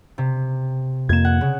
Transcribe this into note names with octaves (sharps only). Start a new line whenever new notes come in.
C3
F2 A#3 G#6 E7
F#5
C#3